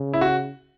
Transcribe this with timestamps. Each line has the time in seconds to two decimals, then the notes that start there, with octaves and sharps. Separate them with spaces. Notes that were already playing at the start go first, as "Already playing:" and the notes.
Already playing: C#3
0.13 E4
0.21 F#4